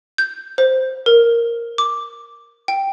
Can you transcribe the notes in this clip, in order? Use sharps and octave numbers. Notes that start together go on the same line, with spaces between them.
G6
C5
A#4
D6
G5